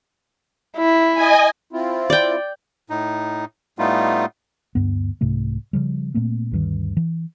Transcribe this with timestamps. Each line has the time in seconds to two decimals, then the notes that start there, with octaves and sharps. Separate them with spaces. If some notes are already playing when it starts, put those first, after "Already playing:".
0.77 E4
1.14 D#5 G#5
1.73 C4 E4 F4
2.10 D5 G5
2.90 A2 D#4
3.79 A2 G3 A3 B3 D#4 F4
4.75 D2 G2 B3
5.21 C2 G#2 C3 A3
5.73 C#3 F3 G3
6.14 A#2 A3 A#3 C4
6.52 D2 G2 D#3
6.97 E3